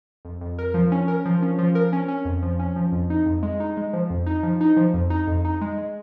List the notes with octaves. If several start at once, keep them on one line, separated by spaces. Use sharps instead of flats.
F2
F2
A#4
F3
C#4
A#4
F3
C#4
F3
A#4
C#4
C#4
F2
F3
C#4
F3
F2
D#4
F2
G#3
D#4
G#3
F3
F2
D#4
F3
D#4
F3
F2
D#4
F2
D#4
G#3
G#3